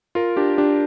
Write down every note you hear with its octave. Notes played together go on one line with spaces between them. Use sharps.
F4 A#4
D4 G4
D4 G4